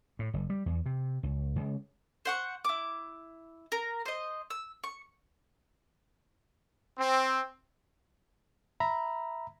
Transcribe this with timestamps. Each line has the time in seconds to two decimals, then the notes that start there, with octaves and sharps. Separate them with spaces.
0.19 A2
0.34 F#1
0.50 G3
0.66 E2
0.86 C3
1.23 C#2
1.56 C#2
2.25 C5 F#5 C#6
2.65 E4 D6
3.72 A#4
4.06 C5 D#5
4.50 E6
4.84 C#6
6.98 C4
8.80 E5 A#5 B5